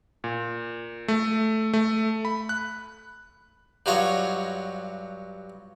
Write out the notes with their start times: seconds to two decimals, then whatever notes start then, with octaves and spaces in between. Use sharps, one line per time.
0.24 A#2
1.08 A3
1.73 A3
2.25 B5
2.49 F#6
3.86 G2 F#3 F4 C#5 D#5